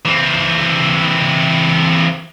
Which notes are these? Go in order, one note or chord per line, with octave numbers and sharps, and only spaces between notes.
E3 C4